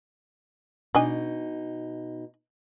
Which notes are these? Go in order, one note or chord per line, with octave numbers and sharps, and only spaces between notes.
B2 D4 D#4 D#5 G#5